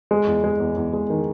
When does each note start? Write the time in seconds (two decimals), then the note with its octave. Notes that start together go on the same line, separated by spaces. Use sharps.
0.11 G#3
0.27 E2
0.44 G#3
0.60 E2
0.77 E2
0.93 G#3
1.10 D#3